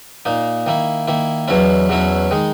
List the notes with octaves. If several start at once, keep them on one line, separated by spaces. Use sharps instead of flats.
A#2 A#3 D#4
D#3 A#3 E4
D#3 A#3 E4
E2 B2 F#3 C#4 E4
E2 B2 F#3 C#4 E4
D#3 G#3 D#4